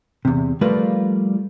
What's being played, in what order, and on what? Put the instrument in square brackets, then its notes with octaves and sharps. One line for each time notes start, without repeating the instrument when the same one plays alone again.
[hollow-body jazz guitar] E2 C3
F3 G3 A3 A#3 F4 B4